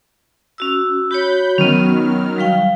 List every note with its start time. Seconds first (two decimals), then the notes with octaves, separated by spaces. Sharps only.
0.58 C#4 F#4 E6
1.11 F#4 C#5 B5 G6
1.58 D#3 F#3 B3 C#4 F6
2.38 G3 F5 G5